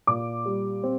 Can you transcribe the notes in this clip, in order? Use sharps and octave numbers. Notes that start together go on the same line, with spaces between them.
A#2 D6
G3
C4